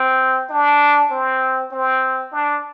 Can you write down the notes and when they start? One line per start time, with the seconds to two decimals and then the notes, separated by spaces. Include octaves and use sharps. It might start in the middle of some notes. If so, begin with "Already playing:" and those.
Already playing: C4
0.50 D4
1.11 C4
1.72 C4
2.32 D4